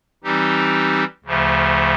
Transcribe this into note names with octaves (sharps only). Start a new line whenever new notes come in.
E3 G3 C4 D#4 G4
D2 C#3 F3 A3